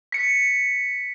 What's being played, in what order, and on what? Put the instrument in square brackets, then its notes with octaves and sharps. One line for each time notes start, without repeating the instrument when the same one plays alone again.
[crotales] B6 C#7